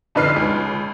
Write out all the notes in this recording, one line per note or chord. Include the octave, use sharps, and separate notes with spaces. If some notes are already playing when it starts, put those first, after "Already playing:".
F2 D3 D#4 B4 F6 C7
C#2